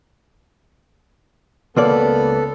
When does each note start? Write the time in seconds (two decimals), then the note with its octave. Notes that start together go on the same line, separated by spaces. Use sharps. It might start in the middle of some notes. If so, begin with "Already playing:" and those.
1.76 C#2 A#3 B3 A4 D5